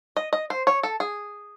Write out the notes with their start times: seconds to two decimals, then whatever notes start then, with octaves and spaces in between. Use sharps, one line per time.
0.17 D#5
0.33 D#5
0.50 C5
0.67 C#5
0.83 A4
1.00 G#4